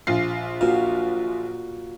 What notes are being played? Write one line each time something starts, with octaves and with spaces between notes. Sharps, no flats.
A#1 F4 C7
A#2 F#4 F5